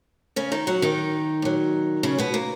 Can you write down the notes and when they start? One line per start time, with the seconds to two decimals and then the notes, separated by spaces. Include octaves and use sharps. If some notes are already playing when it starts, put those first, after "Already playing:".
0.36 C#3 C#4
0.52 D#3 D#4
0.67 F#3 F#4
0.82 D#3 D#4
1.42 A#2 F#3
2.03 C#3 C#4
2.18 B2 B3
2.34 A#3